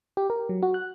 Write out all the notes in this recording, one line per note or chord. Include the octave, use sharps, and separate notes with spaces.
G4
A#4
F#3
F#4
F#6